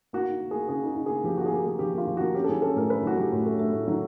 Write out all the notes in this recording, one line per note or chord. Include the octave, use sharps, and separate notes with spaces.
A#3 F#4
D#4
A#3
A#3 G#4
C#3 G#4
D#4 G#4
D#4
A#3 G#4
F3 G4
A#3 F#4
G#4
A#3 G4
A#3 G#4
F3 G4
A#3 F4
F3
A#3 F#4
C#4 G4
A4
F#3 G#4
C#4 A4
A2 A#4
A3 B4
F#3 F#4
F#3 G4
A2
A3
A3
A2
F#3